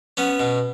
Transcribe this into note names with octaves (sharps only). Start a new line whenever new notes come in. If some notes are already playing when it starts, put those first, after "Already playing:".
B3 C#4
B2